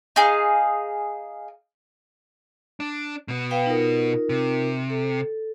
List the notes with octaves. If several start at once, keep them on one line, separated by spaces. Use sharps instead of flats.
D#4 G#4 F5
D4
B2 B3
B4 F5 G5
D#4 F4 A#4
C3
A4